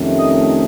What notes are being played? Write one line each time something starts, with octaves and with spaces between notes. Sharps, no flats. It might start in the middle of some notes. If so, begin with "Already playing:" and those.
Already playing: F2 C3 D#3 A3 C#4
D#5